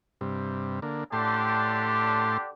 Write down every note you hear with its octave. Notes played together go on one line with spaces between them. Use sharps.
G2 C3
D3 A#3
A2 D3 D4 G4 A5 C6